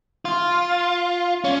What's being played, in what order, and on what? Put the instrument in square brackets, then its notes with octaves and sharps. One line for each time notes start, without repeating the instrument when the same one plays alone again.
[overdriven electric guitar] F4
C#4